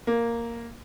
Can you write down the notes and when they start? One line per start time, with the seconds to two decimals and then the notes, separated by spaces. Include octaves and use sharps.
0.07 A#3